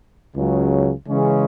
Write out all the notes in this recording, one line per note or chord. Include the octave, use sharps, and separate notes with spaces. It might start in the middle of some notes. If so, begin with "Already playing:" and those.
C#2 C#3 F#3
C#3 E3 G#3 C#4